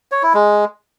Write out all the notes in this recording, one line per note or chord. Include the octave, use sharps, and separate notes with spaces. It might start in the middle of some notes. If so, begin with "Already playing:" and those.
C#5
E4
G#3